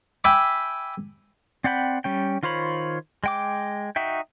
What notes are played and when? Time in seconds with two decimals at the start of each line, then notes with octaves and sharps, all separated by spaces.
0.24 E5 G5 G#5 B5 D6
1.64 C4 D5 F#5 G5 B5
2.04 G3 C#4 G5
2.43 D#3 F4 C5 C#5 B5
3.24 G#3 G5 D6
3.96 D#4 F#4 E5 G5